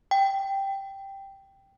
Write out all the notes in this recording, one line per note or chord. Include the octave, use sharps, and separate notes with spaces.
G5